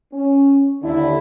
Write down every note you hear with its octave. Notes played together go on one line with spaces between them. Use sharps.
C#4
D#2 D3 E4